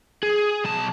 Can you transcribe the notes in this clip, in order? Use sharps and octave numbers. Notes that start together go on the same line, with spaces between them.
G#4
B1 A5